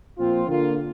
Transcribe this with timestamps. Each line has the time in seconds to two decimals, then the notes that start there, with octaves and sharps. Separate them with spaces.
0.18 A#2 F3 C4 F4
0.48 D3 A#3 F4